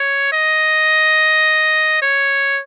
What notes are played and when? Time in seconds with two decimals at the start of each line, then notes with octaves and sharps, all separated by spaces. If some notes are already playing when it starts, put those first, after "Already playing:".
Already playing: C#5
0.32 D#5
2.02 C#5